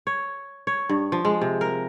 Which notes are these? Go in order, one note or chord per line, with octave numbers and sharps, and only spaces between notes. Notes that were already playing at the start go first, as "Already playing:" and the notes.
C#5
C#5
G2
F3
G#3
C3
A#4